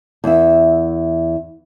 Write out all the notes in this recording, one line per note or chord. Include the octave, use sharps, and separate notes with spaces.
E2 E5